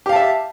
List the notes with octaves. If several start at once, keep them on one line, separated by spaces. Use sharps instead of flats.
G4 E5 F5 A5